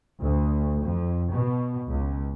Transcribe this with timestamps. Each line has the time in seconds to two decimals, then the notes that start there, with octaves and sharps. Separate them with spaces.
0.21 D2
0.82 F2
1.32 B2
1.90 C#2